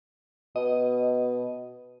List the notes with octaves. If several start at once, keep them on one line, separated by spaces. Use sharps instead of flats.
B2 D#5